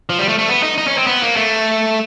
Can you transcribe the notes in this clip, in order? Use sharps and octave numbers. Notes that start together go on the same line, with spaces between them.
F3
G3
A3
A3
B3
D#4
D#4
C#4
C4
B3
A#3
A3